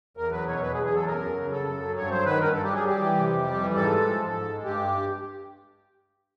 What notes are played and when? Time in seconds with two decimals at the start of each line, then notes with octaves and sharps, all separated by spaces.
0.17 E2 A#4
0.31 F#3 B4
0.47 B2 C#5
0.62 E2 B4
0.73 G#4
0.77 E2
0.85 G#4
0.91 F#3 A4
1.07 F#2 A#4
1.21 F#3
1.36 C#3
1.52 F#2 A4
1.67 F#2
1.81 F#3
1.96 G2 C#5
2.11 F#3 C5
2.25 D#3 B4
2.41 G2 A#4
2.52 G2 A4
2.64 G4
2.71 F#3 G#4
2.85 G3 G4
3.01 E3
3.15 C3
3.30 F2
3.46 G3
3.60 E3
3.75 G#2 A4
3.90 G#3
4.05 F3
4.21 G#2
4.35 G#2
4.50 G#3
4.64 G2 G4